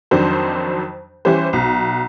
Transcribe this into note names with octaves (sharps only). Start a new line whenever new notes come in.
F2 D#3 F#3 D4 C5
E3 G3 C#4 G4 C5
B1